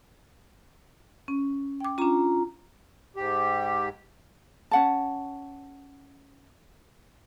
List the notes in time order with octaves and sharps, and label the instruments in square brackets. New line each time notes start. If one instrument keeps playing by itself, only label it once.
[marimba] C#4
G5 D6
[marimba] C#4 D4 [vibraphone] F4 A#5
[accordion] G#2 G4
[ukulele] C#4 F#5 A5